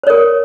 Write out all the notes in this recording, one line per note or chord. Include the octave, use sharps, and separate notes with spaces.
A#4 C5 C#5